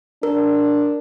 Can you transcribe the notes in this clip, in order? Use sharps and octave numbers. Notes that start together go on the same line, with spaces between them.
D4 A#4